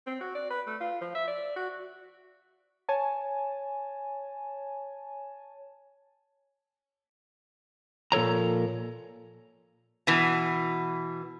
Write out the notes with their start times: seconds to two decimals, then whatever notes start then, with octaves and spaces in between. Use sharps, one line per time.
0.07 C4
0.20 F#4
0.35 D5
0.51 B4
0.67 A3
0.81 F4
1.01 F3
1.15 E5
1.28 D5
1.56 F#4
2.89 C#5 G#5 A5
8.12 A#2 F3 A4 C#5 A#5
10.07 B2 E3